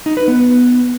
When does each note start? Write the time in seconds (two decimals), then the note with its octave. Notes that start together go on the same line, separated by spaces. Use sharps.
0.06 D#4
0.17 B4
0.28 B3